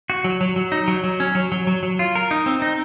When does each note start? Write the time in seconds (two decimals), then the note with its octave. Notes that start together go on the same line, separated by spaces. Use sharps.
0.10 F#4
0.24 F#3
0.41 F#3
0.56 F#3
0.72 D#4
0.88 F#3
1.04 F#3
1.20 C#4
1.35 F#3
1.52 F#3
1.67 F#3
1.83 F#3
1.99 F4
2.15 A#4
2.31 D#4
2.46 C4
2.62 D#4